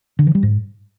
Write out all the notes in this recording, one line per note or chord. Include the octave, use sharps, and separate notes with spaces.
D3
E3
G3
G#2